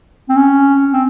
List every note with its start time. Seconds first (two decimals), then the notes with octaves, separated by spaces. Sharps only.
0.29 C4
0.36 C#4
0.93 C4